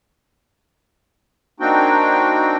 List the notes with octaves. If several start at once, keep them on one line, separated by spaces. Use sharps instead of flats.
A#3 C4 D4 D#4 F#4 G5